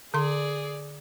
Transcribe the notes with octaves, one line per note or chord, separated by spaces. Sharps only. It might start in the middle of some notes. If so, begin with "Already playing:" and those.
D3 G#4 D5 C6